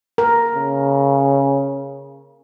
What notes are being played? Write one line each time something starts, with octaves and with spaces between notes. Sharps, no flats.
A#4
C#3